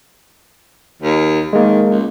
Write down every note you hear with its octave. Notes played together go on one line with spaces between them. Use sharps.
D#2
D#3 G#3 A#3
C#2